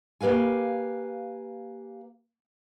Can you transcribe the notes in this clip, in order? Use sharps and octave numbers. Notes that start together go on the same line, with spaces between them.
A#3 G4 B4 F5 G#5